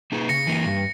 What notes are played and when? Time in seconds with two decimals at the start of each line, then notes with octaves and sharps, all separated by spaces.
0.12 A#3 D#4 G#4
0.29 C#3 A#6 C#7
0.47 E3 A#3
0.65 G2